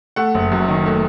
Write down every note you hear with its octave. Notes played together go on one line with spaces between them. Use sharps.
A3 F#5
F#1
F#2
D#3
A3